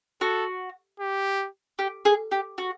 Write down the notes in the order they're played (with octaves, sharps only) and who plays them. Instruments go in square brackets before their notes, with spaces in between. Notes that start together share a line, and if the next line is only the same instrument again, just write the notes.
[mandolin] F#4 [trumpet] A4
[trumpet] G4
[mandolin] G4
G#4
G4
F#4